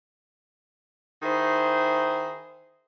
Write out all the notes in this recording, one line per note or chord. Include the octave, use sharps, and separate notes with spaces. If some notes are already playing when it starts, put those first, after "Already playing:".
D#3 E4 G#4 C5